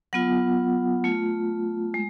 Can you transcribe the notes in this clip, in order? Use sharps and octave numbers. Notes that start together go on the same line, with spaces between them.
F#3 B3 F4 F#5
A3 F4
G#3